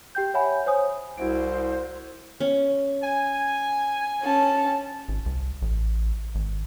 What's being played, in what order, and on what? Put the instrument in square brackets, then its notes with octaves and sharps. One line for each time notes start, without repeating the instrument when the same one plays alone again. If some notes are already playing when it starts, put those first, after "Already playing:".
[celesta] G4 G5 G6
C#5 E5 F#5 G#5 B5
C5 C#5 G#5 D#6
[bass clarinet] C2 [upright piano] E4 F#4 D7 [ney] C5
[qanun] C#4
[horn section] G#5
[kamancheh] C#4 A5
[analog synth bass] G#1
C2
A1
G#1